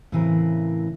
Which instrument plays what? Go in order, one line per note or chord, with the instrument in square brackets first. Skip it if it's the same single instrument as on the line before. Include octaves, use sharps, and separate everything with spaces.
[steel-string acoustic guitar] A2 C#3 E3 C4 A#4